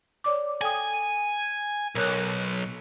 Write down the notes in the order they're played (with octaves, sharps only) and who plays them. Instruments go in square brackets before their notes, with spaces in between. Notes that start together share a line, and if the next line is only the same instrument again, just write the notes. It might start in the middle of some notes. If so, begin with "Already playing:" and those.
[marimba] C#5 D5 D6
[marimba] A4 G5 D#6 [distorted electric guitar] G#5
[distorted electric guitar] B1 [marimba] A#4 C#5 F#6